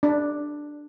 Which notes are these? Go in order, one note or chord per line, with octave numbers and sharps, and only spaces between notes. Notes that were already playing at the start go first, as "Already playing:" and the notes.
D4